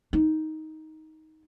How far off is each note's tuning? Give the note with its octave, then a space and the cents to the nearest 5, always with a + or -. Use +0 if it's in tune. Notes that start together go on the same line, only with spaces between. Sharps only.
D#4 +10